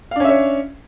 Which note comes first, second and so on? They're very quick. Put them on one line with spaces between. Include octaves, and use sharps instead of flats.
F5 D4 C#4 E5 C#5